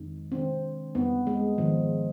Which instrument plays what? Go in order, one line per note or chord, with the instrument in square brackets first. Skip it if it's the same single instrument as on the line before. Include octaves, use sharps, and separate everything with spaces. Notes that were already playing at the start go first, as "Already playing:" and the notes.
Already playing: [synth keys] F2 D#3 G#3 C4 D#4
[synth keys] C3 D#3 G#3 D4 [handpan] C4
[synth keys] F2 D3 G3 C4 D#4 [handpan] B3
[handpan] G#3
[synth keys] G#2 D#3 B3 [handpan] F3